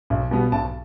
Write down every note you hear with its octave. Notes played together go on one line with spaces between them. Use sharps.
B1
B2 G3 B3
B1 A5